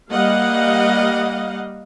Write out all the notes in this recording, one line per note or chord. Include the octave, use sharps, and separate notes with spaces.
G3 A#3 D#5 F5 F#5